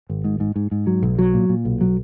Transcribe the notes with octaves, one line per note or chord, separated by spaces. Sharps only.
G#1
G#2
G#2
G#2
G#2
F#3
B1
F#3
A#2
A#2
B1
F#3